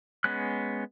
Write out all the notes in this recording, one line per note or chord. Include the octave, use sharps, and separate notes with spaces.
G#3 B3 C#4 F#6